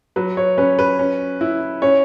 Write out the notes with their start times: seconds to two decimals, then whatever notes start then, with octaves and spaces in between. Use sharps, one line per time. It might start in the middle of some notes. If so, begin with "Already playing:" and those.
0.16 F#3 B4
0.37 C#5
0.58 C#4 B4
0.79 B4
0.99 C#4
1.41 E4
1.82 C#4 C#5